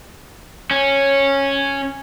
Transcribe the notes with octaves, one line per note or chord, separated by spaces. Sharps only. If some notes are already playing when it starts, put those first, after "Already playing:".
C#4